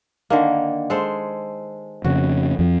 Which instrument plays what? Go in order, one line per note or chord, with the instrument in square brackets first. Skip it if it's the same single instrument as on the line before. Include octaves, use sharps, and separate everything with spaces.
[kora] D3 D#3 A#3
G#3 A4 C5
[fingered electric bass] F2 C#3 [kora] F#4
[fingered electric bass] F2 F3